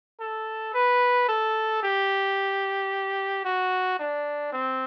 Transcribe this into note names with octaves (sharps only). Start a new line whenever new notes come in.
A4
B4
A4
G4
F#4
D4
C4